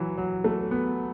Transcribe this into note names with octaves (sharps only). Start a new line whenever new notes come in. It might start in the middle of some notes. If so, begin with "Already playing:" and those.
Already playing: E3 F#3
F#3
A3
B3